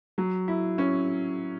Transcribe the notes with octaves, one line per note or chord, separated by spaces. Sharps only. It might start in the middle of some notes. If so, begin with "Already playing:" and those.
F#3
E4
C#4